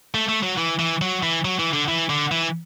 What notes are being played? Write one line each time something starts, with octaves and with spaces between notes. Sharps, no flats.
A3
A3
F#3
E3
E3
F#3
E3
F#3
E3
D3
E3
D3
E3